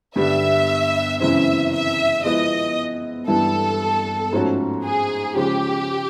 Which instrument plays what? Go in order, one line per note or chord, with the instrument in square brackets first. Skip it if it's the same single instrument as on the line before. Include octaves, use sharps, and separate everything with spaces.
[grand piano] G2 D3 G3 B3 [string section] E5
[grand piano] F#2 C#3 E3 G#3 C4 [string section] E5
[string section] E5
[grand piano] F3 G#3 B3 E4 [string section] D#5
[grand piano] G2 E3 G3 B3 E4 [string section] A4
[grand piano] G#2 F3 A3 C#4 F#4
[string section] G#4
[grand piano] C#3 F3 G#3 [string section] G4